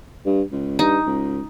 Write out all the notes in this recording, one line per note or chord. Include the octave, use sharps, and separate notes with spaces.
G2
C#2
G2 D#4
C#2